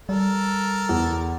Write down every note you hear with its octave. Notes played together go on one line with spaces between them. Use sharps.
G3 A4 A#4
E2